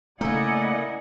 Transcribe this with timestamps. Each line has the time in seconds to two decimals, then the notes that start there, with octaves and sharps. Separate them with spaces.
0.21 C#3 A3 A#3 E4 D5 D#5 F#5 G#5